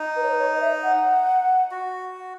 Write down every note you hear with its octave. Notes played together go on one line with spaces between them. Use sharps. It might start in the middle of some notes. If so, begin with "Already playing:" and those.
Already playing: D#4
B4
C#5
B4
C#5
D#5
E5
F#5
F#4